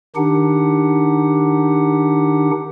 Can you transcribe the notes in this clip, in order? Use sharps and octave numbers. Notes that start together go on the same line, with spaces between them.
D#3 D4 D#4 G4 F#5